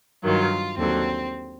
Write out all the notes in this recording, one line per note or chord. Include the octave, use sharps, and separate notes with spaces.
G2 D#3 F#3 F4
D#2 D3 F#3 C4